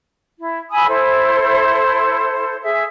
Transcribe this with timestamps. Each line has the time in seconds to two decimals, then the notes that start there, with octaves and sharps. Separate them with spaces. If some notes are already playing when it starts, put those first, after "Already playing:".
0.39 E4
0.70 G#5 B5 D#6 E6
0.87 E4 A4 C5
2.62 G#4 E5